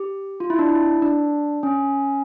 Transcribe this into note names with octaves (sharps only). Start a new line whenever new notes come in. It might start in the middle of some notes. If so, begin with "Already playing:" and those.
Already playing: G4
F4
E4
D4
E4
D4
C#4